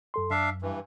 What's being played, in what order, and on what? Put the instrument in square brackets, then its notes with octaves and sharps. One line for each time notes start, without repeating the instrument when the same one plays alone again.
[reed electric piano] F#2 A4 C6
[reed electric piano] F#2 [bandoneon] D4 E5 F5
[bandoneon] G2 E3